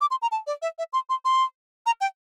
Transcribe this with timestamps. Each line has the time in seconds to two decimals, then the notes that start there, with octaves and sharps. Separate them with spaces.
0.01 D6
0.11 C6
0.22 A#5
0.32 A5
0.47 D5
0.62 E5
0.78 E5
0.93 C6
1.09 C6
1.25 C6
1.86 A#5
2.01 G5